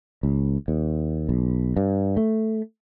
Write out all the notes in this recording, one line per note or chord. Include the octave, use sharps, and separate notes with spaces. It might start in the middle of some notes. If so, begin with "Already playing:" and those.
C#2
D#2
B1
G2
A3